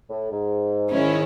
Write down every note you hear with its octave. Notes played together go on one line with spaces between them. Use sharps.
A2
G#2
D#3 G#3 C#4 E4